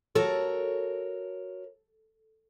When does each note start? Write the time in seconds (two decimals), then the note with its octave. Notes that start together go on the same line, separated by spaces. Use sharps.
0.15 F#4 A4 A#4 C#5